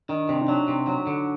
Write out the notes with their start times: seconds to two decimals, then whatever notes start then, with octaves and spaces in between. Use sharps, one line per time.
0.09 D#3 D4
0.29 C3 D4
0.42 D#4
0.48 F#3 D4
0.68 C3
0.87 F#3
1.07 D3